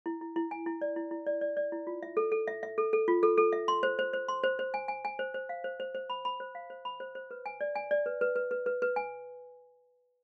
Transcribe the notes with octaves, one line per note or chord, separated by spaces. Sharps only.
E4
E4
E4
G#5
E4
D5
E4
E4
D5
D5
D5
E4
F4
E5
A4
A4
E5
E5
A4
A4
F4
A4
A4
E5
C6
C5
C5
C5
C6
C5
C5
G#5
G#5
G#5
C5
C5
F5
C5
C5
C5
B5
B5
C5
F5
C5
B5
C5
C5
B4
G#5
D5
G#5
D5
B4
B4
B4
B4
B4
B4
G#5